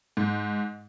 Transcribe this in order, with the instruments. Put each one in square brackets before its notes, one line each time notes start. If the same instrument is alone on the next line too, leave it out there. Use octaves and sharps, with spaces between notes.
[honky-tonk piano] G#2